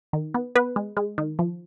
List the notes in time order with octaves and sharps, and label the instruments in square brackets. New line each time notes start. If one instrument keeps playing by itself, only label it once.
[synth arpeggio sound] D#3
B3
B3 B4
G#3
G#3
D#3
F3